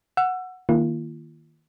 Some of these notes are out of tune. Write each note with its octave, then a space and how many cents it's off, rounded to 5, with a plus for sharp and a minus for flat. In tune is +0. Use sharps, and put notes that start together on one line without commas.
F#5 -5 E6 +25
D#3 +0 A#3 +0 F4 -35